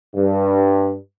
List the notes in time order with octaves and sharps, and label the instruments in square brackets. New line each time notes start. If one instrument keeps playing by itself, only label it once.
[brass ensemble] G2